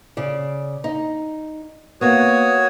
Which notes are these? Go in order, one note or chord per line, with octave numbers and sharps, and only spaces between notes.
C#3 D5
D#4
A#3 B3 F#4 C#5 D#6